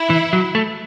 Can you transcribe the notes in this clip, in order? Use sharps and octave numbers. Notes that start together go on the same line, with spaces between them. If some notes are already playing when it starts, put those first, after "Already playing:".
Already playing: E4
E3
F#3
A3